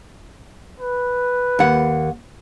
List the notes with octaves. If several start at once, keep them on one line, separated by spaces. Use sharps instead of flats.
B4
D#2 F#5